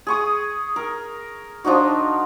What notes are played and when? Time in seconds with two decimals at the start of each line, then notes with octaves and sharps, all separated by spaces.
0.07 G#4 C#6 D#6
0.76 A#4
1.65 F3 D4 D#4 F#4